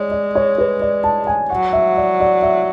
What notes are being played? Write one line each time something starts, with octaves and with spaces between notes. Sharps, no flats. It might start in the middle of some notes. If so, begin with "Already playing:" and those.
Already playing: G#3 C#5 D5
D5
C#5
B4
D5
A5
G#5
F#3 F#5
E5
D5
D5
E5